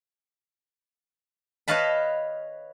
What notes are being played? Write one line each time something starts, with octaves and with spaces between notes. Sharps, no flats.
B4 C#5 D#5 F5 A5 B5